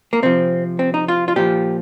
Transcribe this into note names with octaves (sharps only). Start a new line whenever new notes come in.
A#3
C3 F3 C4
C4
D#4
F4
F4
A#2 F3 G4